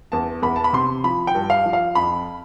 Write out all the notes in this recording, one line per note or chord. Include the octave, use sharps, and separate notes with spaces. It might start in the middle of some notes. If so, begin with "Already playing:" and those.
E2 A5
E2 B5
A5
B5
C3 C6
F3 B5
G5
G2
F5
F3
F5
F2 B5